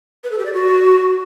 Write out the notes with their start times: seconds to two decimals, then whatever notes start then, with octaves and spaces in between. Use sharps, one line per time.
0.24 B4
0.31 A4
0.38 G4
0.46 D5
0.53 F#4